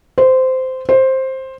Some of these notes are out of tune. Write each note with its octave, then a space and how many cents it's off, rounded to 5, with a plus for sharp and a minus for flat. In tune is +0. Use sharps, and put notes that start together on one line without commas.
C5 -15
C5 +10